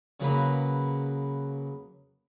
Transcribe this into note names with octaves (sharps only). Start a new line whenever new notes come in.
C#3 F#3 A#3 B4 A#5